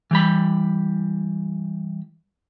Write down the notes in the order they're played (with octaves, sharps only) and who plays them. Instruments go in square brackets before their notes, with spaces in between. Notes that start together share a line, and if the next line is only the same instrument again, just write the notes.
[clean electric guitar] E3 G3 B5